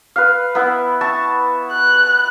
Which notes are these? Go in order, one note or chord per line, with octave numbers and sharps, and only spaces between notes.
B4 F5
B3 E4
E5 A5 C#6
F#6